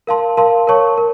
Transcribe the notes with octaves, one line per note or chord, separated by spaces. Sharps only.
A#4 F5 A5 C6
A#4 F5 A5 C6
A#4 C#5 A5 C#6
A#4